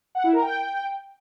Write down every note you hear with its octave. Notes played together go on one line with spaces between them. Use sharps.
F#5
E4
A#4
G5